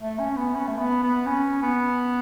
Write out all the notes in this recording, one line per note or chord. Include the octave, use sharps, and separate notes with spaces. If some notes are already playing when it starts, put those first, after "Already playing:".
A3
C#4
B3
C#4
A3
B3
B3
C#4
B3